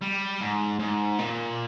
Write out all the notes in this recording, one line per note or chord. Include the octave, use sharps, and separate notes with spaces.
G3
G#2
G#2
A#2